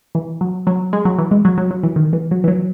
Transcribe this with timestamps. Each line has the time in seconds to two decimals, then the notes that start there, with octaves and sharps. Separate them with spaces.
0.15 E3
0.41 F#3
0.67 F#3
0.93 G#3
1.05 F#3
1.18 E3
1.31 G#3
1.45 F#3
1.58 F#3
1.71 F#3
1.83 E3
1.96 D#3
2.13 E3
2.31 F#3
2.44 E3
2.48 F#3